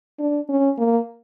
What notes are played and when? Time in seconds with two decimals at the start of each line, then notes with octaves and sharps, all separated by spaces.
0.19 D4
0.49 C#4
0.78 A#3